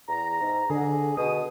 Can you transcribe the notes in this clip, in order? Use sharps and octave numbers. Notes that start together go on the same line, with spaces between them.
E2 A#5
G#2
D3 G#4
B2 D#6